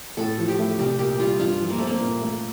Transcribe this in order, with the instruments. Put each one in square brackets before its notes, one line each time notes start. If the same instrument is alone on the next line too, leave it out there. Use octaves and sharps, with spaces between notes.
[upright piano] A2 [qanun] A4
[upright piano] F3
[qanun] G4
[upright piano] A3
[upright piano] C2 [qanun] G4
[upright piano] A#2 [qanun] G4
[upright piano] G3 [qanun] F4
[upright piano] G2 [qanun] F4
[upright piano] F3
[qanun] A#3
[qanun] A3 [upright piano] C4
[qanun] A#3
[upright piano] A#2
A3